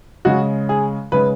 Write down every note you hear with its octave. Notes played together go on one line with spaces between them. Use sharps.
C#3 G#3 F#4
G#4
C#3 G#3 B4